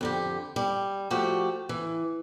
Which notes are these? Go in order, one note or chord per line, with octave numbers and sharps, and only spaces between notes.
F2 D3 G4
G3
F3 A3 F#4 G4
E3